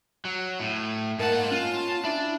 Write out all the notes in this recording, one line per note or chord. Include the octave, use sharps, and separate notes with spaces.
F#3
A2
G#2 A#3 F#5 A5
C#4 F4
D4 E4